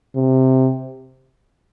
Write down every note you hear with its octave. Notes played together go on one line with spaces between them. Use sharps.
C3